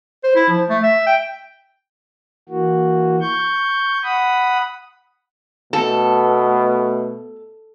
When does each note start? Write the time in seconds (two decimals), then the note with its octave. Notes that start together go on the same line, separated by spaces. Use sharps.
0.24 C5
0.36 E4
0.49 F3
0.69 A3
0.83 E5
1.07 G5
2.49 E3 A#3 F#4
3.21 C#6 G6
4.03 F#5 B5 D#6
5.73 B2 A3 B3 A4